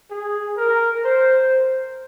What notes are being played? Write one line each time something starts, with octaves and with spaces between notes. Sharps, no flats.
G#4
A#4
C5